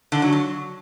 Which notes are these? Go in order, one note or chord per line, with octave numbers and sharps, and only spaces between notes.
D3
F#3
F#3